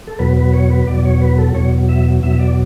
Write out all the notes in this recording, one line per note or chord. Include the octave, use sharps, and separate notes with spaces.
A4
E2 B2 F#3 B4
B4
C#5
B4
E2 B2 F#3 D5
C#5
B4
A4
E2 B2 F#3 C#5
E5
E2 B2 F#3 E5
D5